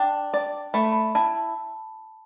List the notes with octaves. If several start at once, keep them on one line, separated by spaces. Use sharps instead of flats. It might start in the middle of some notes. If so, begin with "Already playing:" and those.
Already playing: D4 G5
D5
A3 B5
B5
E4 A5